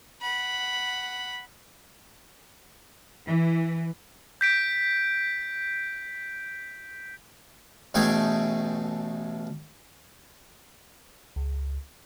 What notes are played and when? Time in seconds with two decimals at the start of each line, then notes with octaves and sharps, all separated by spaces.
0.21 F#5 B5
3.27 E3
4.41 G6 B6 D7
7.94 A1 B2 A3 G#4 G5 G#5
11.36 C#2